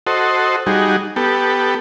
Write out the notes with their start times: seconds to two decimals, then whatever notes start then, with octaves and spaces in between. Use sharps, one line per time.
0.07 F#4 A4 C5 D#5
0.67 G3 D#4 F#4 G#4
1.16 B3 G4 A4